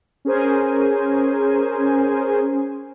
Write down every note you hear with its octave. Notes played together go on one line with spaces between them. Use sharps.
C#4 G#4 A#4 C5 G#5